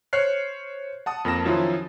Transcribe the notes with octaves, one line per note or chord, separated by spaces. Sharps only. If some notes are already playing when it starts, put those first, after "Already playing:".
C5 C#5 F6 F#6 C7
F#5 A5 D#6
F2 A#3 A5 A#6 E7
D#3 F3 F#3 C#4 E4 F4